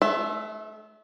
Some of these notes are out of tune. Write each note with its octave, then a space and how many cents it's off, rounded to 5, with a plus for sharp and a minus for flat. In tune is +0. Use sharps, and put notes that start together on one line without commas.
A3 -35 E5 +10